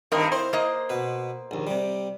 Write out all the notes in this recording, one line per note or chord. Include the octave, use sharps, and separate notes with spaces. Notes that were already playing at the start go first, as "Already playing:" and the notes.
G2 D#3 C4 A#4 D#5
E4 C5
A#3 D#5
B2 B4
A#1 D#2
C3 G3